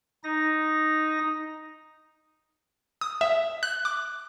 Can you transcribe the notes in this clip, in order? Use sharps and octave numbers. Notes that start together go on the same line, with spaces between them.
D#4 A#6
D#6
E5
F#6
D6